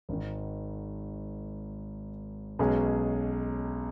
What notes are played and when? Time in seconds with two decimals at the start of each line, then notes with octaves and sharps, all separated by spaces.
0.09 G#1 G#2 D#3
2.59 B1 B2 G#3 C#4 G#4